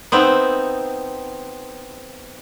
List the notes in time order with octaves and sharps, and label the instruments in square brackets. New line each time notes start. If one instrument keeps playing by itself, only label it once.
[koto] B3 C4 D#4 E5